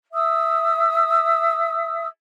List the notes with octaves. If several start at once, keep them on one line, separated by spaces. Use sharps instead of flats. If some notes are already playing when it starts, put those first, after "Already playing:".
E5 D#6 E6